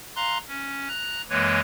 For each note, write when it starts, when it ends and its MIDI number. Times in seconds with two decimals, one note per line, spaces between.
0.16 0.38 77
0.16 0.38 82
0.16 0.38 84
0.16 0.38 90
0.48 0.88 61
0.88 1.22 82
0.88 1.22 90
1.30 1.60 42
1.30 1.60 52
1.30 1.60 56
1.30 1.60 58
1.30 1.60 71
1.30 1.60 73